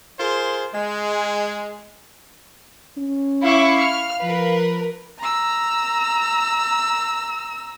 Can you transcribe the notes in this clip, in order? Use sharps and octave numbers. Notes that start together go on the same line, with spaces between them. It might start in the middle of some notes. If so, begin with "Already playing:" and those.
F4 G#4 A#4 C5
G#3
C#4
E4 F5 C#6 D6
F6
F3 A#4 B4
A#5 E6